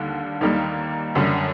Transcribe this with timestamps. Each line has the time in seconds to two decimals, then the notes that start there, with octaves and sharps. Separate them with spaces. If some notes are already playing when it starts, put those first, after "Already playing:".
Already playing: D#2 D3 G3
0.41 D#2 D#3 G3 A#3
1.15 F#2 D3 G3